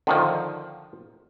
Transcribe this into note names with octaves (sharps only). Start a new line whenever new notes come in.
D3 D#3 F3